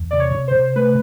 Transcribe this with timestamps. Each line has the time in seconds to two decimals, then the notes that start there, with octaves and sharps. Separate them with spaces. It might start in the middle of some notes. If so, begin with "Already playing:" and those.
Already playing: E2
0.11 C3 D5
0.20 C#5
0.35 C3
0.48 C5
0.55 C3
0.76 A3 B4